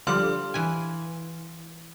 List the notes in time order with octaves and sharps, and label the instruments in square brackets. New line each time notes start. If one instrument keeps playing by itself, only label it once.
[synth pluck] D3 F3 G3 [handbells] F5 C6 F6
[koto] E3 B4 G#5